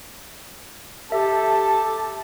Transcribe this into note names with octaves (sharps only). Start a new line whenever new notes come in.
G4 A4 E5 A5